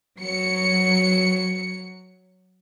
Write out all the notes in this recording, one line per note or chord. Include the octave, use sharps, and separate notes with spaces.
F#3 C#7